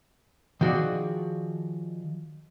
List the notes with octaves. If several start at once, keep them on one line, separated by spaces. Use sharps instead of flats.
D#3 F3 F#4 G#4 D5